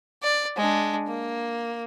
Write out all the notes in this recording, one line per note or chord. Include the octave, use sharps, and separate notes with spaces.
D5
G#3 D4
A#3